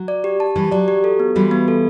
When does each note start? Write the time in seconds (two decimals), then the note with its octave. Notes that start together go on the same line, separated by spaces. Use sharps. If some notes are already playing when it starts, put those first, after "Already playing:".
Already playing: F#3
0.08 D5
0.24 G4
0.40 A5
0.55 E3 G3 G4
0.71 F#3 D5
0.88 G4
1.04 A4
1.20 B3
1.36 E3 G3 F#4
1.51 B3
1.68 A4